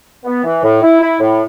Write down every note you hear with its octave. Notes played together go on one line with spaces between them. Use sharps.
B3
E3
A2
E4
E4
A2